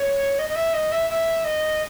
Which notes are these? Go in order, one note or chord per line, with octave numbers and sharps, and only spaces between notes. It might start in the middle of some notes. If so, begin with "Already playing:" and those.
Already playing: C#5
D#5
D#5
E5
D#5
E5
E5
D#5